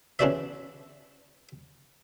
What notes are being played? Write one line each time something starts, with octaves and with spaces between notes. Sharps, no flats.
C#3 E3 D4 F#4 D5 E5